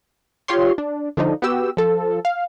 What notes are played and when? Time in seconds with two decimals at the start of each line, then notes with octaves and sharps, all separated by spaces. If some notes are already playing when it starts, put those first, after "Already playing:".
0.48 F4 G4 C#5 C6
0.78 D4
1.17 D3 F3 D4 D#4
1.42 B3 F#4 G4 E6
1.77 F3 A4
2.25 F5